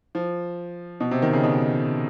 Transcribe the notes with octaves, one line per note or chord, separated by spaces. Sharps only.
F3
B2
C3
D#3
C#3
B2